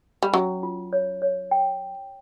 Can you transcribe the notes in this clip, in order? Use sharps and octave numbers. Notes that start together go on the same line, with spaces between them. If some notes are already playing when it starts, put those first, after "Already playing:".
G3
F#3 C#4
F4
C#5
C#5
G5